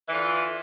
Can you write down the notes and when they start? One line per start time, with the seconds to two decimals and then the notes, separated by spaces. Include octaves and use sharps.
0.08 E3
0.11 D3
0.14 F4